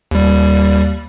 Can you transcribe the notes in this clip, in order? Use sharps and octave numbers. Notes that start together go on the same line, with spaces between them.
D#2 G3